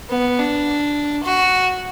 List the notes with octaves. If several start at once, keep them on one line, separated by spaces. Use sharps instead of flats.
B3
D4
F#4